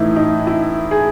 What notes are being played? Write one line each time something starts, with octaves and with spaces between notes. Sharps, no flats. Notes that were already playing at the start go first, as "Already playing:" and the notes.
Already playing: A2 E3 D#4 E4
D#4
E4
G#4